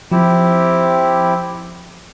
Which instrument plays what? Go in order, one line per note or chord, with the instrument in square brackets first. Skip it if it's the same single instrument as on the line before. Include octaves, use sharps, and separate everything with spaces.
[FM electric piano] F3 [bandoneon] C4 E4 G4